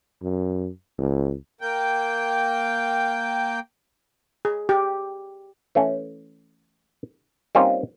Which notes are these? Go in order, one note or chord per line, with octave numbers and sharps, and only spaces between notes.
F#2
C#2
A#3 G5
G#4
G4
E3 A3 C#4
G3 A#3 C4 C#4 D#4 F4